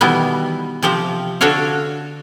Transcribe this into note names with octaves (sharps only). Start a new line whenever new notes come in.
B2 D#3 E3 G3 B3 E4
C3 F3 C4 G4
D3 D4 F#4 A4 C#5 F5